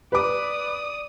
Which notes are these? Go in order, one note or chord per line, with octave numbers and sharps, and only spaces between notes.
B4 D5 D6 D#6